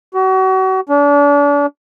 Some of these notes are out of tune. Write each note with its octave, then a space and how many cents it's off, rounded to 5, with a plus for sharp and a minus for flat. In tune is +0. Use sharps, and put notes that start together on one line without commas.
F#4 +35
D4 -35